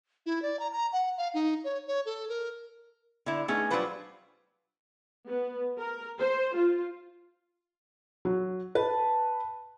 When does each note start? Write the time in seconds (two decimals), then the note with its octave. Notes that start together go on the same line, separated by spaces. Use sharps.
0.26 E4
0.42 D5
0.59 A#5
0.72 A#5
0.93 F#5
1.18 F5
1.34 D#4
1.64 C#5
1.87 C#5
2.06 A4
2.29 A#4
3.26 D3 E4
3.48 A3 B3 C#4 D#4 G#4
3.70 F#3 G3 D4 F4 B4 C5
5.28 B3
5.79 A#4
6.19 C5
6.55 F4
8.25 F#3
8.75 B4 A5